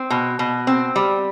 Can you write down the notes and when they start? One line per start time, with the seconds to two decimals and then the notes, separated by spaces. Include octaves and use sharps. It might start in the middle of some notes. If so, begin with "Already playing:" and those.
Already playing: C4
0.10 B2
0.39 B2
0.67 C4
0.96 G3